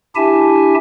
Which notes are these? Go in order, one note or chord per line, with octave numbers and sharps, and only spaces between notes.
D4 E4 G4 E5 G#5 A5